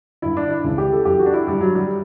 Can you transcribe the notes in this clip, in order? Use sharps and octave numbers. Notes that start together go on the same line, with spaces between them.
G2 D3 E4
D4
E4
C#2 C#3 E3
G4
A4
F#2 E3 G4
F#4
D4
E4
G2 D3 G3
F#3
G3